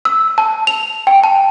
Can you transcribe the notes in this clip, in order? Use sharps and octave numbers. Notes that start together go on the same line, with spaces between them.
E6
A5
F7
G5
A5